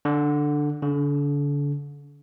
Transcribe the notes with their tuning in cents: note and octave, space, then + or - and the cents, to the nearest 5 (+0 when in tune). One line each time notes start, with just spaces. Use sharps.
D3 +5
D3 -35